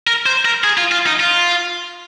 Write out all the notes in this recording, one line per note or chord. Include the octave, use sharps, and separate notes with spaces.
A#4
C5
A#4
G#4
F4
F4
D#4
F4